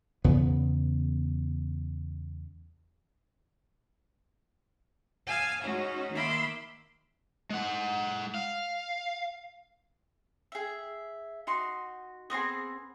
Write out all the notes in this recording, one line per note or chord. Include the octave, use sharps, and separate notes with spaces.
E2 C#3 B3
F5 G#5 A5 D#6 E6
G#3 C#4 D#4 F#4
D#3 A#3 E5 B5 C6 D6
G#3 F#5
F5
G#4 E5
D#4 F#4 C6
B3 C4 D4 G#4